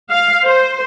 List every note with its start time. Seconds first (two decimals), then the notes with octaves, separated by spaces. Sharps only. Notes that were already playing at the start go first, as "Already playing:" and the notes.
0.11 F5
0.45 C5